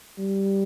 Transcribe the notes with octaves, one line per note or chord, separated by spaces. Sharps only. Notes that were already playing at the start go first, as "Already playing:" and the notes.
G3